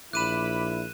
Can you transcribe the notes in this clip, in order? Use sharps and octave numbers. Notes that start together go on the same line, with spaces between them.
A#1 E4 B5 D6 F#6 D#7 E7